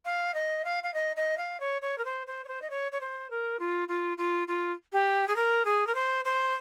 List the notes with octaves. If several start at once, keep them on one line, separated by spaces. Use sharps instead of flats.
F5
D#5
F5
F5
D#5
D#5
F5
C#5
C#5
A#4
C5
C5
C#5
C5
D#5
C#5
C#5
C5
A#4
F4
F4
F4
F4
G4
G#4
A#4
G#4
A#4
C5
C5